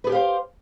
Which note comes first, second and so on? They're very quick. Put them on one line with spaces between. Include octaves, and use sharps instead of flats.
B4 G#4 G4 F5 C5